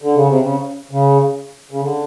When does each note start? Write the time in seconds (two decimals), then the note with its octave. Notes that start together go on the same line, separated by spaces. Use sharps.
0.02 D3
0.15 C#3
0.27 C3
0.41 C#3
0.91 C#3
1.71 C#3
1.81 D3